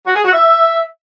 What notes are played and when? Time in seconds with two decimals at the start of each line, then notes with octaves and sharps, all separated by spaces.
0.05 F#4
0.14 G#4
0.23 F#4
0.32 E5